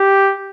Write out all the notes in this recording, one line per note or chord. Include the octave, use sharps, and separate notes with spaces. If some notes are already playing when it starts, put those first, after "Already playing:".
Already playing: G4